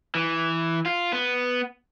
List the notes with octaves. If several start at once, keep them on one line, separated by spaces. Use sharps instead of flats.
E3
F4
B3